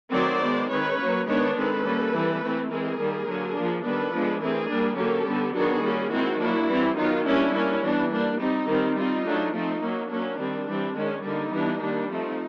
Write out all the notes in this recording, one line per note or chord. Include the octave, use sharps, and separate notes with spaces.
D#3 F#3 A3 C4 C5 D5
D#3 G#3 B3
D#3 G#3 C4 B4 C#5
F#3 A#3 C#4
D#3 G#3 B3 D4 B4 C#5
D#3 G#3 C4 A4 B4
G3 A#3 C#4
E3 G3 C4
E3 A3 C4
E3 G#3 C4 G#4 A#4
D#3 G3 A#3
D3 F#3 A#3
F3 A#3 D4
D#3 G3 B3 D4 A4 B4
F3 G#3 B3 D4
E3 A3 C4 G#4 A#4
G3 A#3 D4
D3 F#3 A#3 C#4 G4 A4
D3 G3 B3
D#3 F#3 B3 D4 F#4 G#4
G3 A#3 C#4
D#3 G#3 C4 E4 F#4
F#3 A#3 D4 E4 F#4
E3 G3 C4
D#3 F#3 B3 D#4 F4
G3 A#3 C#4 D4 E4
G3 A#3 C#4
E3 G3 B3 D4
G3 A#3 D4
G3 C4 D#4
D#3 G3 C4
G3 C4 D#4 F4
F#3 A3 D4
F3 A3 C4 D#4
F#3 A#3 C#4
F#3 A#3 C#4 D4
D#3 G3 C4
E3 G3 C4
D#3 G#3 C#4
D3 G3 A#3 D#4
E3 G3 B3 D4
D#3 G3 A#3 D4
F3 A3 C4 D#4